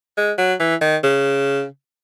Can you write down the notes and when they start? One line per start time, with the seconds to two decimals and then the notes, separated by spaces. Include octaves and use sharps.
0.17 G#3
0.38 F#3
0.60 E3
0.81 D#3
1.04 C#3